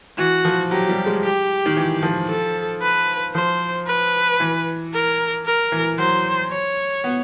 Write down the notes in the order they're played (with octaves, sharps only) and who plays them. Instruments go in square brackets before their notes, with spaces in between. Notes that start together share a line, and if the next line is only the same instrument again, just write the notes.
[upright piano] E3 [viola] F#4
[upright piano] F3
[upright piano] F#3 [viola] G4
[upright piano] G3
G#3
[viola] G4
[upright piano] D#3
E3
F3
[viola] A4
B4
[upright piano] F3 [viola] C5
[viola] B4
[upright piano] E3
[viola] A#4
A#4
[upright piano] E3
[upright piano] F#3 [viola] C5
[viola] C#5
[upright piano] B3